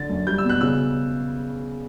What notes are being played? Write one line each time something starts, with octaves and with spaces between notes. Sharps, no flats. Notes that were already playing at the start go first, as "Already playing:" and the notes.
Already playing: D3 A6
F#2
G3 G6
E6
B2
F#6
C#3 E6